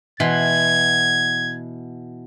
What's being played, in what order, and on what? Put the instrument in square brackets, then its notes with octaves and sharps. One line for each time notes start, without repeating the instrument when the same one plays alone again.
[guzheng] B2 E3 C6 [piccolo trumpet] G#6